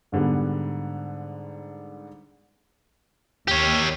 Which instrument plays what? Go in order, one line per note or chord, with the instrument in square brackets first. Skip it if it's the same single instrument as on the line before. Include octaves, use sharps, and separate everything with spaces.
[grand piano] G#2 D3 G3 B3
[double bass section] D#2 [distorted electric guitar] G4 C#5